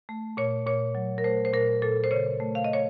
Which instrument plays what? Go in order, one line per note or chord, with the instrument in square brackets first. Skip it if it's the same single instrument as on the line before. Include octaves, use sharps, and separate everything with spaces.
[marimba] A3
A#2 C#5
A#2 C#5
F#3
A#4
A3 C5
C5
A#2 A#4
A#2 A4
C5
C#3 C#5
A3
F5
D#5
C#5